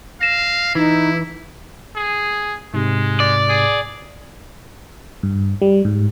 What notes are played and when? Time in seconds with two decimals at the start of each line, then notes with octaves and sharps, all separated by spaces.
0.21 F5 A#6 E7
0.75 E3 D#4 E4
1.96 G#4
2.74 G#2 C3 G#3
3.20 D5
3.49 G#4
5.23 G2
5.62 G3
5.85 G#2